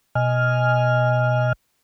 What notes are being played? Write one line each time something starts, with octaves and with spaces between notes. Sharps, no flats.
B2 D#5 G#5 F6